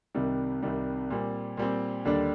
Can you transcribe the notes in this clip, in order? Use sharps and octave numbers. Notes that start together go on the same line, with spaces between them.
C2 C3 D#3 G3
C2 C3 D#3 G3
A#2 G3 C4
A#2 G3 C4
D#2 D3 G3 D4